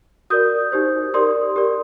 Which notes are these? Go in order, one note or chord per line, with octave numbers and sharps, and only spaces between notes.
F#4 A#4 D5 D#6 G6
D#4 G4 C5
G4 A#4 D5 C6 D#6
G4 A#4 D5